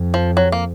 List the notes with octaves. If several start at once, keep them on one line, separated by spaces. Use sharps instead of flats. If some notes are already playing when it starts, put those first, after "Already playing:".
Already playing: F2
F3
F#3
A#3